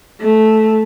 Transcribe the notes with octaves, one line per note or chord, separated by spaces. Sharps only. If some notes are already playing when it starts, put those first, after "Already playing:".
A3